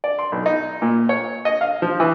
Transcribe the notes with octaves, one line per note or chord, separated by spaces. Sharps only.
D5
C6
B1
D#4
A#2
C#5
D#5
F5
F3
E3